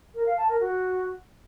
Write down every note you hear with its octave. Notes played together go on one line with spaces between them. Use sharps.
A#4
F5
A5
A#4
F#4